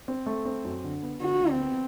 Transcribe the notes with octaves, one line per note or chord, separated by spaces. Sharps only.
C4
A3
C4
F#2
D3
B3
D3 F#4
D2
C4
B3